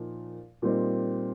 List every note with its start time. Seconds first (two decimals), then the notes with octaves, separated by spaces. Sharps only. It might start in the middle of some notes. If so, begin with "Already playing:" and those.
Already playing: A#2 F3 D#4
0.62 A#2 G3 C4 D#4